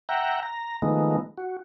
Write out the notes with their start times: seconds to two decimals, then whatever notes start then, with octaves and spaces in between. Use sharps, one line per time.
0.09 E5 F#5 G5 A#5
0.43 A#5
0.82 D#3 F3 G#3 A3 B3 D#4
1.38 F#4